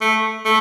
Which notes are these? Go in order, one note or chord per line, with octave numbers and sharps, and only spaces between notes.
A3
A3